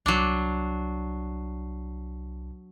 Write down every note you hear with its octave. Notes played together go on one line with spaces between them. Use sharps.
C2 F#3 D4 C7